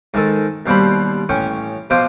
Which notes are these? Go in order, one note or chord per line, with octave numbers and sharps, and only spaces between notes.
G#2 D#3 A4
D#2 B2 G3 C5 B5
A1 C#4 G5 C#6
B2 F3 C5 D6